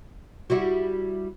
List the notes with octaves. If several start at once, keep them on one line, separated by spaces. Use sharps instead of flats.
G3 E4 F#4